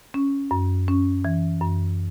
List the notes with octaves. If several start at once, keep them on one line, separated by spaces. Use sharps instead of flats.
C#4
F#2
C#4
E3
F#2